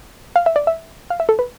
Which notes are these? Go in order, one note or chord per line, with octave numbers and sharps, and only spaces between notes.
F5
E5
D5
E5
F5
E5
A4
B4